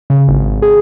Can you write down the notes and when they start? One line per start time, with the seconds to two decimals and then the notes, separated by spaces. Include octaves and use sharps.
0.10 C#3
0.28 G#1
0.62 G#4